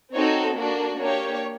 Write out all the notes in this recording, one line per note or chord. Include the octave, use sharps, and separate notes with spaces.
C4 D#4 F#4 A4 C#5
A#3 D4 F#4
A#3 D4 G4 C#5